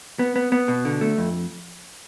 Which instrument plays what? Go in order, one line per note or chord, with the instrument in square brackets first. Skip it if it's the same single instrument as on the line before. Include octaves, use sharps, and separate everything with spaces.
[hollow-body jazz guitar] B3
B3
B3
B2
D3
A3
F2